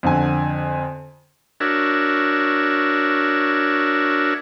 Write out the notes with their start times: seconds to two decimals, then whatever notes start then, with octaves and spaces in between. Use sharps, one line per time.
0.03 F2 D3 G#5
1.60 D4 F#4 A#4 C#5 E5